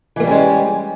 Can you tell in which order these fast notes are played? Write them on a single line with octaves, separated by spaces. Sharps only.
E3 A#3 G3 C#4 G#3